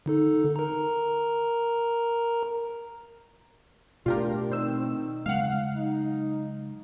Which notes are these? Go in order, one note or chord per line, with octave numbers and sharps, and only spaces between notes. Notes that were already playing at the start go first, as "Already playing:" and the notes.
D3 D#4 A4
A#4 A#5
B2 A3 D4 F4 G4 A#4
D#3 C4 E6
C#3 F#3 G#3 F5 F#5
D#4